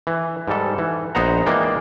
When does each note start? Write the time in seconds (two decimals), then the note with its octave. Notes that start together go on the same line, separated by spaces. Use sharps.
0.07 E3
0.48 G#2 G3 A4
0.78 E3
1.15 A#1 B3 D#4 C5 F#5 A#5
1.46 E3 G#3 A#3 D5 G5